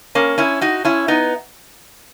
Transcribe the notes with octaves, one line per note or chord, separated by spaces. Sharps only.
A#3 C#4
C#4 E4
D#4 F#4
C#4 E4
B3 D#4